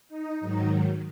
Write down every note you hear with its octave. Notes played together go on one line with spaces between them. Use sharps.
D#4
G#2 D#3 F#3 D#4